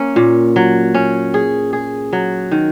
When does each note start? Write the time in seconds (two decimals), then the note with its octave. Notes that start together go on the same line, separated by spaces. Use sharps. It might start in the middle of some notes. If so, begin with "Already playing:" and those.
Already playing: A#3 C#4
0.16 A#2
0.56 F#3
0.94 C#4
1.34 G#4
1.73 G#4
2.13 F#3
2.51 D#3